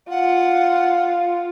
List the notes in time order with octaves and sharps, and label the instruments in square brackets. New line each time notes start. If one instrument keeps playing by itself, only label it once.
[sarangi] F4 [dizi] F#5